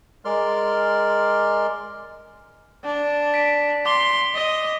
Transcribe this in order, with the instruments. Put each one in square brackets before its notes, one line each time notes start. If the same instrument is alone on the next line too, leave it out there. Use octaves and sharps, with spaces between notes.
[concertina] G#3 A#4 D5 C6 F6
[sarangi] D4
[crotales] B6 D7
[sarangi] C6 [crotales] D6 G7
[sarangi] D#5